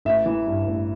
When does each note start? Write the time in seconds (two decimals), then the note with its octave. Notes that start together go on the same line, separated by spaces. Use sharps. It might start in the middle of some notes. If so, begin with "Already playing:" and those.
0.05 A1 E5
0.26 E3
0.47 G2
0.67 A1